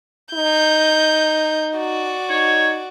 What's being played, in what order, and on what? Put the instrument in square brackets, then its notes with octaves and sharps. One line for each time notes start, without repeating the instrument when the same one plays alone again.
[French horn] D#4 [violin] G6
[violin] F#4 D5
[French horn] D#4 [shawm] C#5